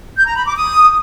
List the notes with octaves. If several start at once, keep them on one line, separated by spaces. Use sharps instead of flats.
G6
A#5
B5
D6
D#6